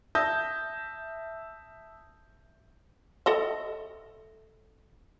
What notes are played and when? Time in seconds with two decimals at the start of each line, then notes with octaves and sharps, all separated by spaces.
0.15 E5 A5 D#6 E6 G6 A#6
3.26 A4 D#5 E5